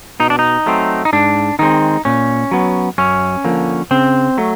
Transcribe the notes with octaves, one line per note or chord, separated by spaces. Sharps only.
B2 D#4
D4
D#4
F#3 A3 C4
D#4
G#2 D4
D#3 G#3 C4 D#4
A#2 C#4
F#3 B3
F#2 C#4
D3 F3 A#3
C#3 C4
F#3 A3